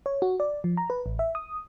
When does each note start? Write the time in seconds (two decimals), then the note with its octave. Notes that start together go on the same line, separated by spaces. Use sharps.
0.06 C#5
0.22 F#4
0.40 D5
0.64 F3
0.77 A#5
0.90 B4
1.06 A1
1.19 E5
1.35 D#6